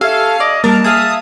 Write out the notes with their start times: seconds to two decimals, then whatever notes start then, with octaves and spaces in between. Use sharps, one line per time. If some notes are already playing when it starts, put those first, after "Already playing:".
0.01 C#4 G4 A4 E5 F5
0.40 D5 D#5
0.64 G3 A#3 D4 A#4 A5
0.84 G#4 E5 F5 D#6